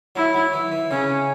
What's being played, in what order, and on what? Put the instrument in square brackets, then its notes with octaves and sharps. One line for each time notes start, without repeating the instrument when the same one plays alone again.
[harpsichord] F#3 [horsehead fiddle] E4
[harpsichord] F#3
E3
E3
[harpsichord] C#3 [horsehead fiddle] C#4